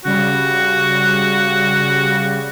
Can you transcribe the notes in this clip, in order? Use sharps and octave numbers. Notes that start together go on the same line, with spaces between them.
C#3 G3 F#4